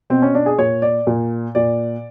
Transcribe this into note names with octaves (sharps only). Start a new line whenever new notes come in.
B2 C4
C#4
D4
G#4
A#2 C#5
D5
A#2
A#2 D5